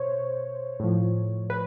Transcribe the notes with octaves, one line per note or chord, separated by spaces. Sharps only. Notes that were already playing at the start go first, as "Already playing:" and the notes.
Already playing: B2 C5 C#5
A2 F3
B4